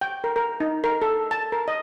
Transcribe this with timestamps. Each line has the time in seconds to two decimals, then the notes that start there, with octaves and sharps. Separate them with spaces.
0.01 G5
0.24 A#4
0.36 A#4
0.60 D#4
0.84 A#4
1.02 A4
1.31 A5
1.52 A#4
1.68 D#5